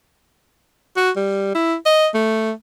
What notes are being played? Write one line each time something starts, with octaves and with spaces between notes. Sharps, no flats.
F#4
G3
E4
D#5
A3